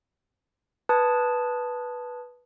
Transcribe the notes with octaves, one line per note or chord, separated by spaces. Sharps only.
B4 A5 D#6 G#6